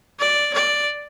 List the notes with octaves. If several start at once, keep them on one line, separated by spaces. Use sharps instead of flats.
D5
D5